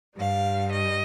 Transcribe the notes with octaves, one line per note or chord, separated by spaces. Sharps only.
G2 G3 F5
D#5